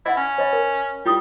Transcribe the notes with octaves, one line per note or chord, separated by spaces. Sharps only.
E4 D#5 F#5 B5
C#4
C#5 D#5 B5
A#4
G3 E4 F4 D#6